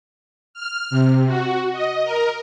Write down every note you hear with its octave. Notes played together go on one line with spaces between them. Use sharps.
F6
C3
F#4
D#5
A#4